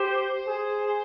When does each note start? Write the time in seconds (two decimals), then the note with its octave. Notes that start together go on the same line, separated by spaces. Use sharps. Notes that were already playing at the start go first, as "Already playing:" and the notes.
Already playing: G4 C5
0.47 G#4